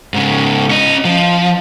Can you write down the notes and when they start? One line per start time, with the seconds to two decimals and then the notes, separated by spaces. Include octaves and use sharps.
0.14 G#2 C#3
0.71 C#4 D#5
1.05 F3